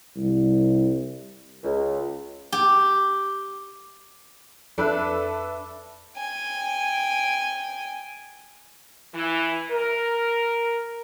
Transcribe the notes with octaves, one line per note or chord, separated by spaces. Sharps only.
C2
C#2
G4
F2 D4 A4 B4 E5
G5 G#5
E3
A#4